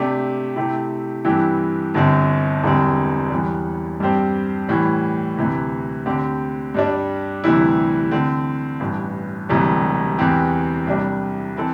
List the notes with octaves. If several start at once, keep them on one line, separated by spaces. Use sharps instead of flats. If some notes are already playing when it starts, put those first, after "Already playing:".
Already playing: C3 A3 D4 G4
C3 A3 C4 E4 G4
G2 E3 C4 E4 G4
G1 G2 D3 C4
E1 E2 D3 G3 C4
E2 E3 G3
G2 G3 C4 G4 C5
A2 E3 G3
D2 C3 E3
D2 D3 C4 G4
G2 G3 D4
D2 C3 E3 G3 E4
D3 A3 C4
A1 G2 E3
E1 D2 C3 E3 G3
E2 E3 C4 G4
C2 C3 G3 D4
E3 C4 A4